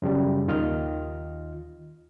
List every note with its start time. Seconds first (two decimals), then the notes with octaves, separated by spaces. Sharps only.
0.02 F#2 C#3 G3
0.48 D#2 D#3 F4 D#5 F6